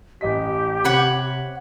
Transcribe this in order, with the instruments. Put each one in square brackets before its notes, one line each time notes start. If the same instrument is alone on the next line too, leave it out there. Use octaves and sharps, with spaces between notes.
[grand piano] A1 D#5 B6 [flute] G4
[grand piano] C3 [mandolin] C#5 F#5 B5